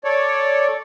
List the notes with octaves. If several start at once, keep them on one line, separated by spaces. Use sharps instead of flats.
A4 C#5 D5